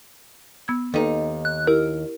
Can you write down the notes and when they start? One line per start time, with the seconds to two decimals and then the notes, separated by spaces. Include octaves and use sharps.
0.68 B3 E6 G#6
0.94 D#2 D#4 A4 B4
1.45 F#6
1.67 E4 G4 A#4